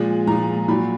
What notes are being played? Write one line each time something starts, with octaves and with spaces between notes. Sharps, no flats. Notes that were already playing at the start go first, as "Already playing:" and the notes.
Already playing: A#2 F3 G#3
A#2 F3 G#3 A#5
A#2 F#3 B5